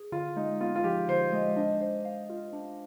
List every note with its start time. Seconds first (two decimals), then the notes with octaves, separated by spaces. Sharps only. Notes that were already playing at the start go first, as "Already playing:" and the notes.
Already playing: G#4
0.12 D3 F4
0.36 G#3 D#4
0.61 B3 F4
0.76 F4
0.84 F3 G4
1.09 D3 C5
1.32 G#3 D#5
1.56 D4 D#5
1.81 C5
2.05 F5
2.30 F4
2.53 D4